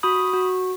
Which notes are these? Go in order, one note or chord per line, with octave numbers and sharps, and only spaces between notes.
F#4 B5 D#6
F#4